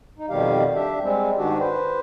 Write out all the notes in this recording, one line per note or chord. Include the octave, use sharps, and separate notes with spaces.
D#4
F2 B2 D#3 G3 G4 F5
D4 G4 E5
G3 G#3 C4
G#2 D#3 D4 F#4 G4
B4 C5